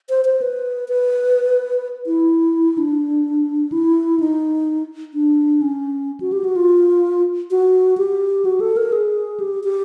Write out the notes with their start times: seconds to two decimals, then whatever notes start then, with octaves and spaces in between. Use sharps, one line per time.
0.10 C5
0.25 C5
0.42 B4
0.88 B4
2.06 E4
2.78 D4
3.72 E4
4.20 D#4
5.14 D4
5.62 C#4
6.20 F#4
6.32 G4
6.44 F#4
6.56 F4
7.51 F#4
7.98 G4
8.45 F#4
8.60 A4
8.77 A#4
8.92 G#4
9.40 G4
9.64 G4